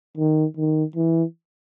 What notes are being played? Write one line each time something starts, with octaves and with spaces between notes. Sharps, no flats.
D#3
D#3
E3